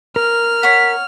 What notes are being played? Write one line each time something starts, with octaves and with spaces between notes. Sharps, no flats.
A#4 F6
C#5 F#5 B6